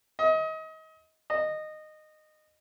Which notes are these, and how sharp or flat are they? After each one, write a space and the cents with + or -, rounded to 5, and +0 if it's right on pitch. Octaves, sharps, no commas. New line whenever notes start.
D#5 +30
D#5 -15